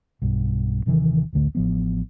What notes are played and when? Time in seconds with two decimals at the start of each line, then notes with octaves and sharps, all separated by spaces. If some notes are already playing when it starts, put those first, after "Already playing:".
0.22 B1 G2
0.86 D#1 C3 D#3 E3
1.33 A1 D2 D3 A3
1.55 A1 F3 B3